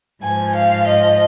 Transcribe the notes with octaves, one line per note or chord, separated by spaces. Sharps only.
G#2 F3 G#5
F5
D#5